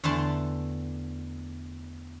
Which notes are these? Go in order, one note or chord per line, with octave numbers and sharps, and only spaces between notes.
E2 D3 A3 D5 A5 C6